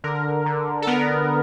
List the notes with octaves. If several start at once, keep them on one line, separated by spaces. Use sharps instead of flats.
D3 A#4
D3
A4
B3 A#4